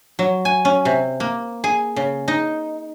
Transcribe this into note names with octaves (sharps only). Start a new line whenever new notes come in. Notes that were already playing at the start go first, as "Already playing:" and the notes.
F#3
G#5
C#4
C3
A#3
G#4
C#3
D#4